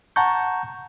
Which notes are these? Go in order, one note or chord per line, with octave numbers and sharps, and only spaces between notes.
F#5 A5 A#5 C#6 G6